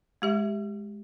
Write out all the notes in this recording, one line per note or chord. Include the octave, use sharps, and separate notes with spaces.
G#3 G4 E5